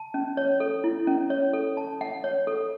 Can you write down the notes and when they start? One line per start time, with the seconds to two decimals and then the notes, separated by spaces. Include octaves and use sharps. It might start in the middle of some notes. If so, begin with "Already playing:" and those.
Already playing: A5
0.14 C#4
0.37 C#5
0.60 A4
0.84 E4
1.07 C#4
1.30 C#5
1.53 A4
1.77 A5
2.01 F#5
2.24 C#5
2.47 A4